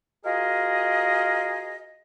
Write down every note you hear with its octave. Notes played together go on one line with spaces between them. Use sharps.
F4 F#4 G#4 A#4 D#5